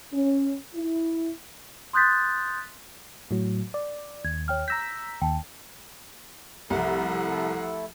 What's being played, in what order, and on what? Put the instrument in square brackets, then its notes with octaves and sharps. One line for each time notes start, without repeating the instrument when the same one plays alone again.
[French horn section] C#4
E4
[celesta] C6 D#6 F#6 G6 A6 B6
[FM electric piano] A2 F#3
D5
[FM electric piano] D#2 [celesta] G#6
[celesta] C#5 G5 F6
[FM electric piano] A#5 E6 B6 [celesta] G6 A#6
[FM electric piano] D#2 [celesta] G5 A5
[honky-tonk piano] C2 [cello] F3 F#5 [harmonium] A3 E4 A4